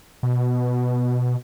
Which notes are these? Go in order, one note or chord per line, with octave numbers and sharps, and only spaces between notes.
B2